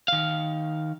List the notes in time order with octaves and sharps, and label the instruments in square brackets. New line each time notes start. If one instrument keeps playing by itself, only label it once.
[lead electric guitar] D#3 F5